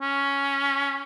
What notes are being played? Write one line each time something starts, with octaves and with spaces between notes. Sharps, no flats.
C#4